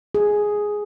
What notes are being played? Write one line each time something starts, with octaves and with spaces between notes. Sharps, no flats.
G#4